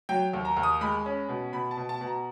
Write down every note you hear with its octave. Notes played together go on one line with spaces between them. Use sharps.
F#3 G5
D#2
A#5
D#2
D#6
G#3 B5
C#4
B2
B2 B5
A5
B2
A5
B2
A#5